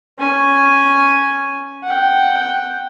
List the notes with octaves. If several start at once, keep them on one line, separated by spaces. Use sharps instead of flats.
C#4 G#5
F#5 G5